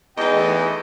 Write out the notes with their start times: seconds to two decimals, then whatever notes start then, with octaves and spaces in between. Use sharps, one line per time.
0.18 E2 D#4 G#4 D#5 G5
0.34 E3 A3